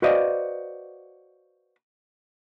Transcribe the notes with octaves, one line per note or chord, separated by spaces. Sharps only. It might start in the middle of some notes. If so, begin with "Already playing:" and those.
F#4 B4 C5 D5 D#5 F5